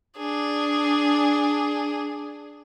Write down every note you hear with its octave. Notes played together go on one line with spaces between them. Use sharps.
D4 G#4